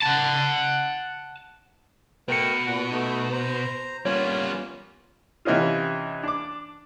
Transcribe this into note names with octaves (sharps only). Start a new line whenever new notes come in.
F#5 A5
B2 A3 A#4 B4 G5 C#7
A#2 F#5
A3 B3 D#4
C5 A#5
G3 A#3 B3 C#4 F4 C#5
C3 E3 C#4 D#4 F4
D4 D6